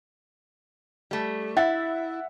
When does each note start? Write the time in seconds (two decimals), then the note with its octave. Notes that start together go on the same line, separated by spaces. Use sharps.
1.11 G3 A3
1.57 E4 E5 F#5 A6